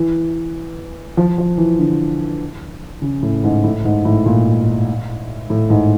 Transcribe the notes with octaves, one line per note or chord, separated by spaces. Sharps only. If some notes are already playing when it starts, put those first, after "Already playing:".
Already playing: E3
F3
F3
E3
D3
C#3
A2
G#2
A2
G#2
A2
A#2
A2
G#2